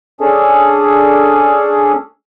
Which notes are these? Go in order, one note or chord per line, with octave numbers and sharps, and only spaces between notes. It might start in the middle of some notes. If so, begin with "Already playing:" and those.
C#4 D4 G#4 A4